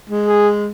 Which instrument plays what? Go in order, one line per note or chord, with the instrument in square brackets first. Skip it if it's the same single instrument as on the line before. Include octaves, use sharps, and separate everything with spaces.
[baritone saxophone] G#3
[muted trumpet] G#4